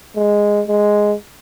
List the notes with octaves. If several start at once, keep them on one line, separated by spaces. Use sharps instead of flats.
G#3
G#3